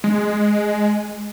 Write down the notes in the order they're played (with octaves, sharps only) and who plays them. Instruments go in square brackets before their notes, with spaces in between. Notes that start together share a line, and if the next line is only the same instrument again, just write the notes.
[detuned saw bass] G#3